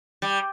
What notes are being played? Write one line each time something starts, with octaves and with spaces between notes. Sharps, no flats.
G3